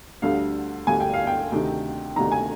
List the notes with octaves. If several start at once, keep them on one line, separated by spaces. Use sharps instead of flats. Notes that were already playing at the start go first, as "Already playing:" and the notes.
D2 D3 G3 F5
D2 D3 G3 G#5
G5
F5
G5
D2 C3 D#3
D2 C3 D#3 A#5
G#5